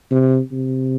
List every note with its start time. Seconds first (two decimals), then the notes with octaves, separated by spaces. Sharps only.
0.11 C3
0.52 C3